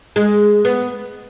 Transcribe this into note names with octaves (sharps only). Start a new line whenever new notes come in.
G#3
B3